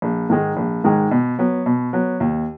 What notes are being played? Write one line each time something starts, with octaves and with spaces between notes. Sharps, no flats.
A#1
G#2 D#3 G#3
A#1
G#2 D#3 G#3
B2
F#3 B3
B2
F#3 B3
D#2